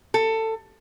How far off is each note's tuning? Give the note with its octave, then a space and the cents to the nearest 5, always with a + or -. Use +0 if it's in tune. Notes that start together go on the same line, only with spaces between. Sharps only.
A4 +20